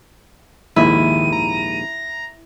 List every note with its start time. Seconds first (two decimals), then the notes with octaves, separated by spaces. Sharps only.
0.76 A#1 D#2 G#2 D#3 E4 D#7
1.32 A#5